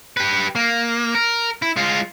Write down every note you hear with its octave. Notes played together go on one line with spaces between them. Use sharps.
G4 B4
A#3
A#4
E4
G#3 F4